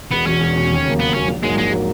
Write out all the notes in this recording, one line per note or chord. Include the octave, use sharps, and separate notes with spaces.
E1 B3
E2 B2 C#4
E1
E2 B2
D#2
C#3 F#3 A#3
D#2 B3
C#3 F#3 A#3 C#4
A#1
G#2 F#3 G#3 A#3
A#1 G#3
F#3 A#3